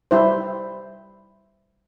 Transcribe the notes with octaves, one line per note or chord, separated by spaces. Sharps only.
G3 E4 C5